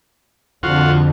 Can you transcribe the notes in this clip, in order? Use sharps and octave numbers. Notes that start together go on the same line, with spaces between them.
F2 D3 F4 F#4